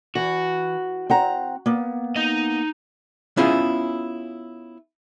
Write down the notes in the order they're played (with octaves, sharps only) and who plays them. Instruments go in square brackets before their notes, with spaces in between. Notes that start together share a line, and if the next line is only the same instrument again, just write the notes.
[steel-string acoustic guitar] E3 [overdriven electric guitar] F#4
[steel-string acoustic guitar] C4 F#5 A#5
A#3 B3
[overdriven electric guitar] D#4 D#5
[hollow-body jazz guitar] B3 C#4 E4 F4 G#4